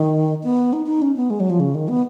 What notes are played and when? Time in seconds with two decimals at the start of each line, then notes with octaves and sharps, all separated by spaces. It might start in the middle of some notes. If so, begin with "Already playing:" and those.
Already playing: D#3
0.44 B3
0.73 D#4
0.86 D#4
1.02 C#4
1.17 B3
1.30 G#3
1.40 F#3
1.50 F3
1.60 C#3
1.75 D#3
1.88 B3